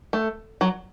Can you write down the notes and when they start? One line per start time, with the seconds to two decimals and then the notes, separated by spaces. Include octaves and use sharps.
0.13 A3
0.61 F#3